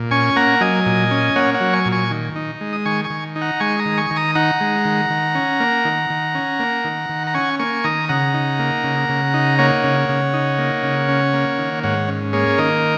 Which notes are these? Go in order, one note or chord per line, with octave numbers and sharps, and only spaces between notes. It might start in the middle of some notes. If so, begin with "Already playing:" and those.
Already playing: A#2
C#4 G#5 C#6
A#3 F#5 A#5
F#3 D#5 G#5
A#2
C#4
A#3 C#5 F#5
C#5 F#5
F#3
G#5 C#6
A#2
G#5 C#6
D#3
D#4
G#3
D#6
D#3 G#5 C#6
G#5 C#6
D#3
D#4
F#5 A#5
G#3 G#5 C#6
A#5 D#6
D#3
G#5 C#6
D#3
A#5 D#6
D#4 F#5 A#5
G#3
D#3
D#3
C#4
A#3
D#3
D#3
C#4
A#3
D#3
D#3
A#5
C#4 G#5 C#6
A#3 G#5 C#6
D#3 A#5 D#6
C#3 F#5 A#5
D#4
A#3
C#3
C#3
D#4
A#3 C#5 F#5
C#3
C#3
D#4
A#3
C#3
C#4
A#3
D#3
G#2 C#5 F#5
C#4
A#3 G#4 C#5
D#3 A#4 D#5